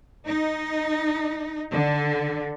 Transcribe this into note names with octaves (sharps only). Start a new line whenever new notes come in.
D#4
D3